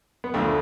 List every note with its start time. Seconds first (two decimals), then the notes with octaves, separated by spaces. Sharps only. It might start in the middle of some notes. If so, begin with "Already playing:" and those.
0.24 B3
0.34 D2 D3 F3 A3